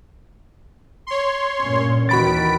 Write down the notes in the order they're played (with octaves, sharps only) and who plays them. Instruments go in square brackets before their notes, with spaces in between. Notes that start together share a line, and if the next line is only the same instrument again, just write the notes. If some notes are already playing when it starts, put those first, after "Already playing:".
[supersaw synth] C#5 C6
[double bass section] G2 A#2 C#4
[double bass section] D#2 D#3 E3 [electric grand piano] F#4 B5 A6 [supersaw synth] B6 D7